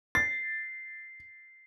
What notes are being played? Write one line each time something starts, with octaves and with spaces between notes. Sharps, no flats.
A6 C7